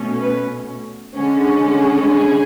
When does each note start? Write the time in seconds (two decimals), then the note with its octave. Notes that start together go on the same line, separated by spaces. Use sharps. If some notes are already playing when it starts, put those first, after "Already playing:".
Already playing: B2 A3 C#4
0.21 B4
1.15 D3 G#3 C#4
2.09 G#4